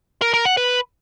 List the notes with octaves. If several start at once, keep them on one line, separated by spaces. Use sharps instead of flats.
A#4
A#4
F#5
B4